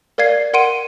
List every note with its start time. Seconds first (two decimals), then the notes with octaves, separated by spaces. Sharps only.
0.18 A#4 D5 F5 G#6 C7
0.54 A#4 F#5 C6 D7 D#7